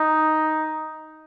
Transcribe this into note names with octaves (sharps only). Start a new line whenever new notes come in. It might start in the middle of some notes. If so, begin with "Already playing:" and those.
Already playing: D#4